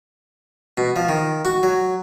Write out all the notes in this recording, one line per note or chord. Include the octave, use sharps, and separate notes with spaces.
B2
F3
D#3
F#4
F#3